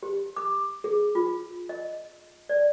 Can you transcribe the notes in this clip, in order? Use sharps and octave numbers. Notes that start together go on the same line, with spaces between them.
G4
D6
G#4
F4
D#5
D5